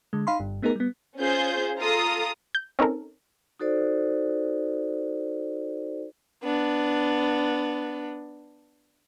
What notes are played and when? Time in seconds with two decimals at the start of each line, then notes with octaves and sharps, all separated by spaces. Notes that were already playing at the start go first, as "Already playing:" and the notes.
0.13 D3 G#3
0.27 D#4 F5 B5 C6
0.40 G1 G2
0.62 A3 B3 D#4 G#4 A#4
0.76 G3 B3
1.18 C#4 F4 G#4 C5 G6
1.80 F4 A4 A#5 D#6
2.55 G6
2.79 C4 C#4 D#4 A4 A#4
3.60 D#4 F#4 A4 C5 D5
6.43 B3 D4